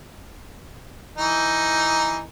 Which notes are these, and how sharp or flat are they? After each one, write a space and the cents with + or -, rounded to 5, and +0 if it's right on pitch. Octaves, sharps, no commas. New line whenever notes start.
E3 +5 D#4 +5